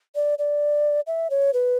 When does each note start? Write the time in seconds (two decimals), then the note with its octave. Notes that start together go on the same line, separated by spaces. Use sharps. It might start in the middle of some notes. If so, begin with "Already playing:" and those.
0.15 D5
0.38 D5
1.07 E5
1.30 C#5
1.53 B4